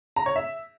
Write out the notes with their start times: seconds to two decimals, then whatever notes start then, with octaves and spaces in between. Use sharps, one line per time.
0.16 A#5
0.26 C#5
0.36 E5